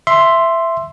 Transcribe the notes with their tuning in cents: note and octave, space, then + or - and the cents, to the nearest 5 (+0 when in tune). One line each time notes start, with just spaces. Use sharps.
E5 +10 C6 +0